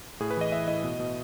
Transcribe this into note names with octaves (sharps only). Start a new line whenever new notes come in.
A2 G#4
B4
E3 D#5
E3 E5
A2 D#5
B2
B2